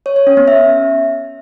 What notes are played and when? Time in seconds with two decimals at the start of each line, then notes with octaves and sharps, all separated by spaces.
0.06 C#5
0.16 C#5
0.27 C#4
0.37 B3
0.48 E5